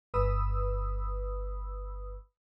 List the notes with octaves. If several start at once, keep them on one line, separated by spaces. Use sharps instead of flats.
G1 B4 B5 D#6 E6